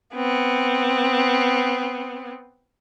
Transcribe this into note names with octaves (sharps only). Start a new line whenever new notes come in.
B3 C4